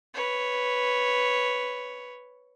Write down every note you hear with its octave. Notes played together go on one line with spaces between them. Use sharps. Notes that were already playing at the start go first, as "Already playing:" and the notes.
B4 C#5